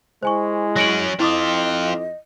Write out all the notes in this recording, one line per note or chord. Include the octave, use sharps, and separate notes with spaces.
G#3 E4 C5 G#5 C#6
F#3 C#4 A#6 D7 F#7
F2 C4 E4 F4 D#5 D6 D#6